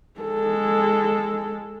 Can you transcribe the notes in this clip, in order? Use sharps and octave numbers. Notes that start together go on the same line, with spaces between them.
G#3 A4